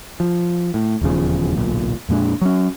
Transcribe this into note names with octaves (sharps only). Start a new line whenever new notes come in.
F3
A2
D#1 E2 C#3 F3
D1 B1 A#2
F2 A#2 G#3 D4
F#3 C#4